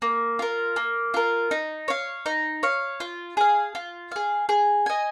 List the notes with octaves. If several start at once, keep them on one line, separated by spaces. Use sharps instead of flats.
A#3
F4 A#4
A#3
F4 A#4
D#4
C#5 F5
D#4
C#5 F5
F4
G#4 F5
F4
G#4 F5
G#4
D#5 G#5